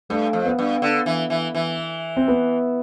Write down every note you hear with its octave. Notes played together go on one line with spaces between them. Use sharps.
G2 A3
F2
B3
G2
D3
E3
E3
E3
C4
B3